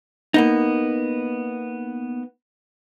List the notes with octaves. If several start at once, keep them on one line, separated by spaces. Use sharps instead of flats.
A#3 B3 D#4